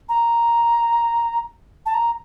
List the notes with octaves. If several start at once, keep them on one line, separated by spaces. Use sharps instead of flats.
A#5
A5
A#5